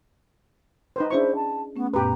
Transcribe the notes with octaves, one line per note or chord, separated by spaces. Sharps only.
D#4 B4 C5
C#4 D4 E4 G#4 C5 C#6
A5
A3 B3 C#4
F#2 A#2 B3 G4 B4 A#5